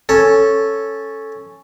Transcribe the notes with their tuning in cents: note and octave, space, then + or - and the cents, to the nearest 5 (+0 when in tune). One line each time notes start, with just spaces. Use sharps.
C#4 +0 A4 +0